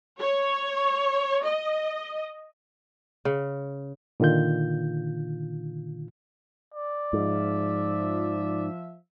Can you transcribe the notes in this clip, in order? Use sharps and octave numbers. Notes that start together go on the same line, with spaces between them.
C#5
D#5
C#3
A#2 D3 D#3 F4 G6
D5
G#2 F3 E5